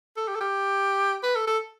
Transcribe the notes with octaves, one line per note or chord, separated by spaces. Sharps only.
A4
G4
A4
G4
B4
A4
A4